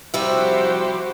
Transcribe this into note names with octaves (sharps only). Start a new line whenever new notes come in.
C3 F3 G3 E4 F#4 G4 C5 E5